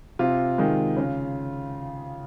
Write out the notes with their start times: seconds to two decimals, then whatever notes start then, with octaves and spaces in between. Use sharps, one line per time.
0.19 C3 F4
0.58 D#3 G#3
0.97 C#3